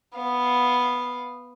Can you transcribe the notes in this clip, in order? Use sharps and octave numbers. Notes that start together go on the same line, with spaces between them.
B3 F5